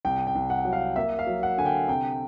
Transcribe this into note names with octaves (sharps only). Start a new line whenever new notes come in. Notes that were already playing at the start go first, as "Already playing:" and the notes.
C2 G5
G5
C2
F#5
F#3
F5
A#3 E5
F5
F#3
F#5
D3 G#5
G5
C3 G5